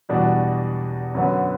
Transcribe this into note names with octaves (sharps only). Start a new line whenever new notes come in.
E2 B2 G3 D4 F#4
F#2 D3 F#3 B3